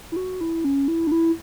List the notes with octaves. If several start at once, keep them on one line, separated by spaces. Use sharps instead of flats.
E4
F#4
E4
C#4
E4
D4
E4